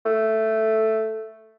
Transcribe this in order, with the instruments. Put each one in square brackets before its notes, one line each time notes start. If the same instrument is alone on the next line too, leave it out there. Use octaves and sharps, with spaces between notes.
[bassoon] A3